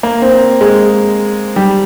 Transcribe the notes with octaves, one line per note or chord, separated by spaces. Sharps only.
A#3
C4
G#3
G3